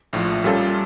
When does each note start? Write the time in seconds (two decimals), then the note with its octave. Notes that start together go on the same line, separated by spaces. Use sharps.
0.13 A#1 A2 F3
0.44 A#2 G3 C#4 F4 A4